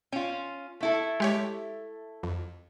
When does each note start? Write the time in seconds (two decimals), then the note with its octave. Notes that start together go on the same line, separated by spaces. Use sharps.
0.12 C#4 F4 G5
0.80 A3 E4 A4
1.20 G#3 G4 C#5
2.23 F2